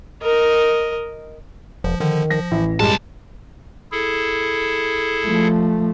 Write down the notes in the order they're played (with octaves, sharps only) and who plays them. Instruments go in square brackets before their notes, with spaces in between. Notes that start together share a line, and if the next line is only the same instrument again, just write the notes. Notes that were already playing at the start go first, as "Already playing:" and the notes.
[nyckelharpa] A#4 D#5
[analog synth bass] E1 [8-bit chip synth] F3
[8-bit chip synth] D3 F3 [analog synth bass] D#3
[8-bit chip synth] F3 [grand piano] A#6
[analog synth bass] A1 [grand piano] E3
[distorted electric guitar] B1 A5 [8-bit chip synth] F#2 A2 [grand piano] G3 G#3
[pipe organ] E4 G#4 A4
[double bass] F3 A3